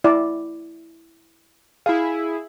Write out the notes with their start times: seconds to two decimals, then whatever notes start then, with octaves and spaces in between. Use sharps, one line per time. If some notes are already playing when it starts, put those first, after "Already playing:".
0.04 E4 D5
1.86 E4 G#4 F5